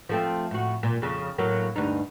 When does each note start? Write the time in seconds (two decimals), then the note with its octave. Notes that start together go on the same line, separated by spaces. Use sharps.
0.09 F3 A3 C4
0.51 A2 F#4
0.83 A#2
1.02 F2 C#3
1.38 A2 F#3 A#3
1.76 D2 G2 D#4